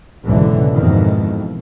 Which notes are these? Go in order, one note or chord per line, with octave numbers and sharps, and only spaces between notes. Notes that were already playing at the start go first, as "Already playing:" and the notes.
F#1 C#2 G#2 B2 D3 E3
F2 G#2 B2 D#3 E3